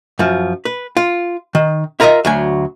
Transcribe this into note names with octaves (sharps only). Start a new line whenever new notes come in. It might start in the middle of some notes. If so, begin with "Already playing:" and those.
F#2 F3
B4
F4
D#3
E4 F4 A#4 C5 D#5 E5
D2 F#3 G#5